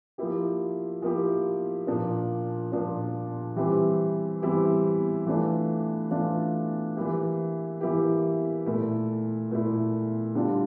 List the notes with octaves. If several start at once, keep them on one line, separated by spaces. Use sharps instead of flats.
F3 A#3 E4 G4
F3 A#3 E4 G4
A#2 F3 A#3 D4
A#2 F3 A#3 D4
E3 G3 C4 E4 G4
E3 G3 C4 E4 G4
E3 A3 D4 F4
E3 A3 D4 F4
E3 A#3 E4 G4
E3 A#3 E4 G4
A#2 A3 E4
A#2 A3 E4
D3 G3 D4 F4